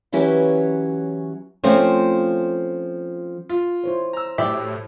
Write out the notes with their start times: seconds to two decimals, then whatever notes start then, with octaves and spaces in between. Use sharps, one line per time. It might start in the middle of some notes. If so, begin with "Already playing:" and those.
0.12 E3 F#3 C#4 E4 G4 B4
1.64 F3 A3 C4 C#4 F4
3.49 F4
3.84 E4 C5 C#5
4.13 A#5 E6
4.38 A2 F#3 E4 G4 D5 E5